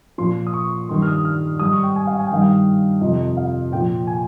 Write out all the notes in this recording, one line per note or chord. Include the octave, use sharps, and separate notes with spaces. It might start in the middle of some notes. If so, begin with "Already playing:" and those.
A#2 F3 C6
D#6
C#6
G2 D#3 G3 C6
F6
D#6
F6
G#2 G3 D#6
C#6
G5
G#5
F5
G#5
G5
G2 D#3 G3 F5
G5
F2 C3 F3 D#5
F5
A#2 F3 G5
G#5